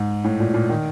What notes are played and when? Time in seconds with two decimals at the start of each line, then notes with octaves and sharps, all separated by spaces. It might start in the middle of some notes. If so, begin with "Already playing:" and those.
Already playing: G#2
0.24 A2
0.40 A#2
0.54 A#2
0.70 D#3